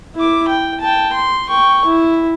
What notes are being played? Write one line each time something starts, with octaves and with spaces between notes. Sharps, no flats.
E4 D6
G5
G5 A5
C6
G5 C#6
E4